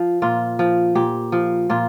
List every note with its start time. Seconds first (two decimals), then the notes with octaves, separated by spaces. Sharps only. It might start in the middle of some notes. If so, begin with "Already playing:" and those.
Already playing: F3
0.22 A#2 F4
0.59 F3
0.95 A#2 G4
1.32 F3
1.70 A#2 F4